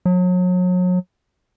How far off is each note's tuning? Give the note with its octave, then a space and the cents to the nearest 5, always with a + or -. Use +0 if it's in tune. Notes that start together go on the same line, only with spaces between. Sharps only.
F#3 -35